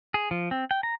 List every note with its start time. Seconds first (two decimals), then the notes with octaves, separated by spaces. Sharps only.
0.14 G#4
0.31 F3
0.51 C4
0.71 G5
0.83 A#5